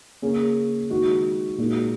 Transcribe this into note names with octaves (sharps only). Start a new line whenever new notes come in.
C#3 A#3 C#4 G#4
D#3 G#3 F#4
A#2 G#3 D#4 F#4